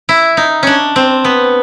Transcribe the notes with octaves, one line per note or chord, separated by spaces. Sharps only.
E4
D#4
C#4 D4
C4
B3